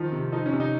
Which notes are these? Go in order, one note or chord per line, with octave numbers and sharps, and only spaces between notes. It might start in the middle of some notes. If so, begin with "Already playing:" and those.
Already playing: D#3 F3 F4
C3
F3 D#4
C#4
C3
D#4